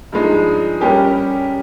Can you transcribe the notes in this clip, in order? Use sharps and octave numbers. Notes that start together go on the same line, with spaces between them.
G2 F3 G#3 D#4
G3 C#4 G4 A#4